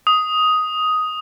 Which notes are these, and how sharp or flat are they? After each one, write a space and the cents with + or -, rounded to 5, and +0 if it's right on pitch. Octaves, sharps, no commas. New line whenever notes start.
D#6 +5